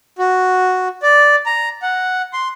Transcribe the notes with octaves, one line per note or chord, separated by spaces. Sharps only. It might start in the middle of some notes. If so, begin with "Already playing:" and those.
F#4
D5
A#5
F#5
C6